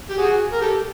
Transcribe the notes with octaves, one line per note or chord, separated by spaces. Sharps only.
G4
F#4 G#4
A#4
G4 A4